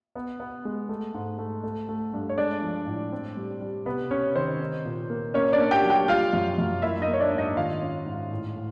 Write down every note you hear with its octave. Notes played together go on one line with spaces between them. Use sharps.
B3
B3
G#3
A3
G#2
A3
A3
A3
G2
C#5
G#3 D4 D5
F3
A2
C4
G3
G3
C3 B3 B4
C3 C#4 C#5
D#3 C4 C5
D#4
A#2
A#3
A#3 C#4 C#5
D4 D5
A#3
G4 G5
F#3
G4 G5
G3 F4 F5
F#2
F#2
A#3 E4 E5
D#4 D#5
A#3
C#5
D4 D5
G#2
D#4 D#5
D#3 F4 F5
C#4
G#2
A2
A2